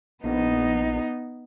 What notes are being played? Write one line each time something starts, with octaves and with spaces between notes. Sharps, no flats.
A#1 B3 D#4